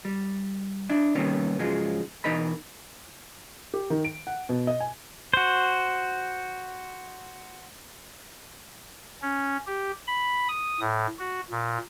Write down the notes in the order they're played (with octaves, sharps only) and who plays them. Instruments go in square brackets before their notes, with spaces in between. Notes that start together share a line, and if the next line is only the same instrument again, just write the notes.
[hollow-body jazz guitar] G3
D4 E4
C3 D#3 G3 A#3 B3 C#4
G#2 C#3 F3 F#3 G#3
B2 E3 D#4 A#4 D#5 B5
[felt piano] G4
D#3
D7
F#5
B2
D#5
G#5
[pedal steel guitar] F#4 C5
[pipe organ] C#4
G4
B5
D#6
A2
F#4
A#2